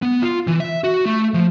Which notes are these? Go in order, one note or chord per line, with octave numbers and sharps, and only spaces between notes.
B3
F4
E3
E5
F#4
A3
F3